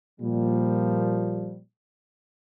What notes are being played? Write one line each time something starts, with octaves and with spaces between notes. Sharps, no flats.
A#2 F3 G3